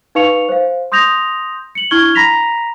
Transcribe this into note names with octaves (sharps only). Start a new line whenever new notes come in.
D#4 B4 F5 C#6 C#7 F7
C5 F5
C6 D#6 G6 A#6 F7
C#7 F#7
D4 E4 C#6 F6 G#6 G7
A#5 B5 A#6 B6 F7